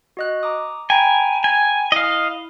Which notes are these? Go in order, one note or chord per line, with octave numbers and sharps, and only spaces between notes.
F#4 D#5 F#6
A#5 D6 D#6
G5 G#5 A#5 B5
G#5
E4 D#5 F5